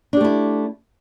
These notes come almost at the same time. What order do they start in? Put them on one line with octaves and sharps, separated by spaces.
D4 G4 A3 E4